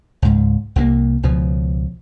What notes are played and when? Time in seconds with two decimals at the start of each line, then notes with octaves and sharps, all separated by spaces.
0.22 C#2 G#2
0.76 C2 C3 F#3 A#3
1.23 C#2 B2 F3